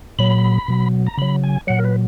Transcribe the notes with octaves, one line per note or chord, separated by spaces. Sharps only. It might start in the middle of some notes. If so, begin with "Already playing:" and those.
A#2 F#3 B5
B2 F#3
A#5
C#3 F#3 B5
G#5
A#2 F#3 F#5
A#4
B4